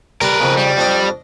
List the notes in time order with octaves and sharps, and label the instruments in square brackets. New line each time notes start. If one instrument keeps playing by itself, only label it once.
[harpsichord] G3 G5 C6 [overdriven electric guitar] A#4 B4
[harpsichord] F2 C#3
[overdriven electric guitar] G3
[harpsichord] F2 D4 D#5